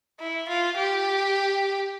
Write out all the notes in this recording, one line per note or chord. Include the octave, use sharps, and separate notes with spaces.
E4
F4
G4